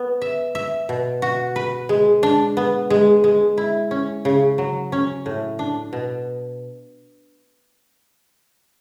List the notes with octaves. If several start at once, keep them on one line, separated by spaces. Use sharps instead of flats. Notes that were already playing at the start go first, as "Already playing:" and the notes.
Already playing: B3
E5
E5
B2
F#4
B4
G#3
D4
B3
G#3
G#3
E4
C#4
C#3
F#3
C#4
A2
D4
B2